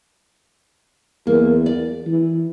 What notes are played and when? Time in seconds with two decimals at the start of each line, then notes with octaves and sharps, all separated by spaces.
1.27 E2 A#3
1.66 D5
2.07 E3